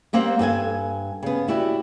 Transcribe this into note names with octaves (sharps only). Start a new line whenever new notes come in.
G3 A#3 C4 F#5 G5
G2 A4 G5 G#5
C#3 B3
E4 F#4 G4 D5